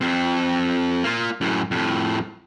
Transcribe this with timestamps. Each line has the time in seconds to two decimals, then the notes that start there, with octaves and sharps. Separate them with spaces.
0.01 F2 C4
1.03 A#3 F4
1.41 F#2 A2
1.71 F2 A2